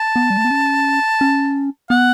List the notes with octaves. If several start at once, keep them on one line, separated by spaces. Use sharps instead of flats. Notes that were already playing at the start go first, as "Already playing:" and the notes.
Already playing: A5
B3
G3
A3
B3
C#4
C#4
B3 F#5